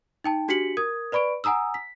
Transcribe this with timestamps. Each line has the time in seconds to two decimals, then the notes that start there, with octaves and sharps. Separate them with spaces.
0.24 D#4 G5 A5
0.48 D4 F#4 G4 B6 C#7 F#7
0.77 A#4 D#6 G#6
1.12 B4 D5 B5 C#6 D7
1.44 F#5 G#5 A#5 D#6 E6
1.74 B6